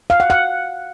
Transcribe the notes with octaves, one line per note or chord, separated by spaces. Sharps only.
F5
F#5
F#5